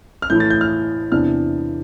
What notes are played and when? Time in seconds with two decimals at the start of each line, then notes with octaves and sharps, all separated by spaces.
0.22 F6
0.30 A2 E3 A3 E4 G6
0.40 A6
0.50 G6
0.61 F6
1.12 E2 C3 E3 B3 D4 F6